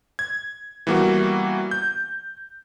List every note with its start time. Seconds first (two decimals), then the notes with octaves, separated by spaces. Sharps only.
0.19 G#6
0.87 E3 G3 A#3 B3 F#4
1.71 G6